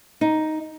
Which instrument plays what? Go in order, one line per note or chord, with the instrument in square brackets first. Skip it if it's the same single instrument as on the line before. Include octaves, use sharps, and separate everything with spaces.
[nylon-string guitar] D#4